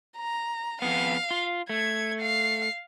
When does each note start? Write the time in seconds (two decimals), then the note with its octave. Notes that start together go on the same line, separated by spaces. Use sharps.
0.18 A#5
0.82 F2 B3 F5
1.31 F4
1.69 A3 G#6
2.21 F5 C7